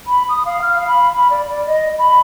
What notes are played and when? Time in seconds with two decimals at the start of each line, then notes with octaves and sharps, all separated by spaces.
0.07 B5
0.29 D#6
0.45 F5
0.62 F6
0.75 F5
0.88 B5
1.18 B5
1.30 D5
1.48 D5
1.67 D#5
1.98 B5